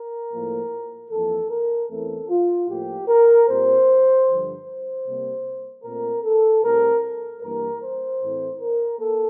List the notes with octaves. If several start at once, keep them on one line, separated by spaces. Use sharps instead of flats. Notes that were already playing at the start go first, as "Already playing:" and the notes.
Already playing: A#4
A2 F3 A#3
F2 E3 A#3 A4
A#4
E2 E3 A3 C4 A4
F4
A2 F3 A#3 G4
A#4
A#2 G3 C4 C5
G2 D3 F3
C5
C3 G3 A#3
A#2 A3 C4 A#4
A4
A2 G3 C4 A#4
G2 E3 A#3 A#4
C5
A2 E3 A3 C4
A#4
A#3 A4